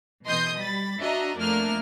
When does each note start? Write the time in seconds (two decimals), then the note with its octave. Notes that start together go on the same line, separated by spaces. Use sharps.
0.25 B2 E3 D#5 C6 D#6 G6
0.60 G3 B5 A6
0.99 D4 F#4 D#5 E5 A#5
1.37 F2 A3 A#3 D4 A#4 F6